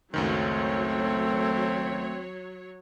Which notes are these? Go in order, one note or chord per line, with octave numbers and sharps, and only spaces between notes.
C#2 F#2 D#3 F#3 A3 C4 C#5